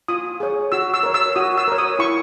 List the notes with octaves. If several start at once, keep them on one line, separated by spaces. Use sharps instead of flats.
F4 D#6
G#4 C#5
F#4 E6
E6
A#4 C#5
E6
F#4 D#6
E6
A#4 C#5
D#6
E4 C#6